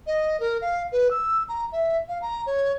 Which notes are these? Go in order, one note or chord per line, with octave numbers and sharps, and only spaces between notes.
D#5
A#4
F5
B4
E6
A#5
E5
F5
A#5
C#5